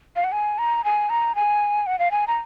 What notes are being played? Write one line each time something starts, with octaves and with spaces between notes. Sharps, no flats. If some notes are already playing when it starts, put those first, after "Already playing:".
F5
F#5
G#5
A#5
G#5
A#5
G#5
F#5
F5
G#5
A#5